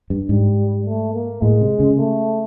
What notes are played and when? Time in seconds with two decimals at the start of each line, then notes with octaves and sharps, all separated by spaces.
0.10 G2
0.29 G#2 G3
0.85 A3
1.13 A#3
1.42 A2 G#3
1.61 C3
1.80 C#3
1.98 A3